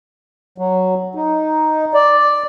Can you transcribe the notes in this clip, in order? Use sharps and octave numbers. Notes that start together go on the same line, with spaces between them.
F#3
D#4
D5